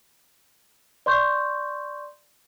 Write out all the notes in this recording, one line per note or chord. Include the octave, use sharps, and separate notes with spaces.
D5 C6 C#6 G6